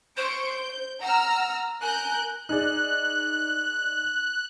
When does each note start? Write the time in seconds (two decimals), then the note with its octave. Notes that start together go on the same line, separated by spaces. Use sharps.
0.17 C5 C6 C#6 D7
0.52 G6
1.01 F#5 A#5 E6 F6
1.82 A#4 G#5 F#6 G6
2.49 D#4 G#4 D5 F#6